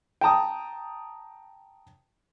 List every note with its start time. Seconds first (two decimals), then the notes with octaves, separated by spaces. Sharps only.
0.21 G5 A5 A#5 D#6